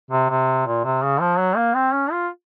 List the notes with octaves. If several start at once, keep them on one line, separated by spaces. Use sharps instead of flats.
C3
C3
A#2
C3
C#3
F3
F#3
A#3
C4
C#4
F4